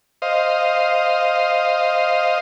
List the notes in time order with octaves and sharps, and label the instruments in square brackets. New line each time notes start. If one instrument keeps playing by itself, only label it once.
[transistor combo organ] C5 D#5 F5